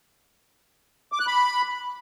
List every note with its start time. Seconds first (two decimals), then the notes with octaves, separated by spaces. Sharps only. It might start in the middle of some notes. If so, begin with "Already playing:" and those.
1.12 D6
1.20 F#6
1.27 B5